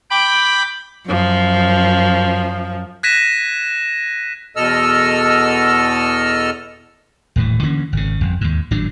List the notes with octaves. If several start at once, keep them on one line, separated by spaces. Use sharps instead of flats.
G5 B5 D6
F#2 F3
F#6 G#6 A#6 B6 D#7 E7
E2 B2 A4 D#5 E6 F6
D#1 A2 E3
D3 E3 A#3 C#4
G#1 C#3
G1 F2
D#2 G#2
G#1 A2 F#3 D4